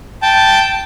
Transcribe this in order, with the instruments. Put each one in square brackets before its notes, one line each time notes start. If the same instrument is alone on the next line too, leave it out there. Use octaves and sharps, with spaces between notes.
[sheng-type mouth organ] G5 A5